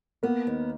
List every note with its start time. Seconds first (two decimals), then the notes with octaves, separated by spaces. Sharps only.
0.23 A#3 B3
0.47 D#2